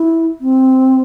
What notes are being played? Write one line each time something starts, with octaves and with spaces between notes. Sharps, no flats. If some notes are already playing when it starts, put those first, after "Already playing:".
Already playing: E4
C4